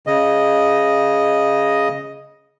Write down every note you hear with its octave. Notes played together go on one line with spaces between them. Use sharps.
C#3 D#5